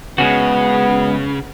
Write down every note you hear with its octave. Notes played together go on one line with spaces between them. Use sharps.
C#3 G#3 B3 C#4 F#4